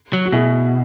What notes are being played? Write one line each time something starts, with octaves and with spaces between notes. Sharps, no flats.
F#3
F#4
B2 E4 G#4